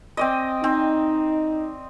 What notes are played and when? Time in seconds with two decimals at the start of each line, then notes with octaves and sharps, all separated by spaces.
0.17 C4 D5 D#5
0.64 C4 D#4